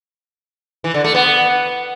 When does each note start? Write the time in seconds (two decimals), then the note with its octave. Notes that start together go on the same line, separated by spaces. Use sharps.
0.84 E3
0.94 D3
1.04 A3
1.15 B3